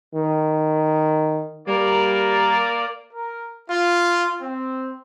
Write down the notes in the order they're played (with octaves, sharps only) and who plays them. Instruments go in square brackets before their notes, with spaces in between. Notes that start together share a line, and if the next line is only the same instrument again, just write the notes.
[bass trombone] D#3
[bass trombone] G3 [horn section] A#3 A#4 D5
[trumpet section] A#4
F4
C4